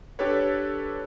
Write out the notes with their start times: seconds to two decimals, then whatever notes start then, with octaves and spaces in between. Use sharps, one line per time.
0.19 D4 G4 A4 B4 C#5